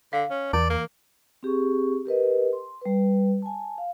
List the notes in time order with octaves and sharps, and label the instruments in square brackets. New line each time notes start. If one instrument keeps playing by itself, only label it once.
[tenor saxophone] D3 [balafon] F5
[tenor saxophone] C#4
[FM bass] E2 [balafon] E3 [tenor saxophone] D5
[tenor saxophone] A#3
[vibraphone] C4 G4 G#4 C#6
G4 A#4 B4 D#5
C6
G3 B4
G#5 A5
F5